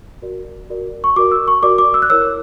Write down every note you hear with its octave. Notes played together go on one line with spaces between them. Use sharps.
F#4 A#4 D5
F#4 A#4 D5
C#6
F#4 A#4 D5 D6
E6
C#6
F#4 A#4 D5 D6
D6
E6
F#6
E4 A#4 C#5 E6